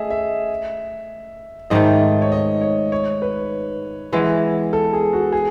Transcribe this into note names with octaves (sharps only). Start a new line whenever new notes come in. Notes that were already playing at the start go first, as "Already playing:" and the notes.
Already playing: A3 G#4 D#5 E5
E5
G#2 D#3 A3 D#5
C#5
D#5
C#5
C#5
B4
E3 G#3 B3
A4
G#4
F#4
G#4